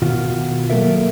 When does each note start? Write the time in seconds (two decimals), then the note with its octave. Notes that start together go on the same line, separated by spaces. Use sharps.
0.02 B2 D#3 F4 F#4
0.70 F#3 A#3 C#4 A4 A#4 E5